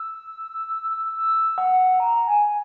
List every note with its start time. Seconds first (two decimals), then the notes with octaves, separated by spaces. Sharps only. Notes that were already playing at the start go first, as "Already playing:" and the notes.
Already playing: E6
1.16 E6
1.58 F#5
2.00 A#5
2.28 G#5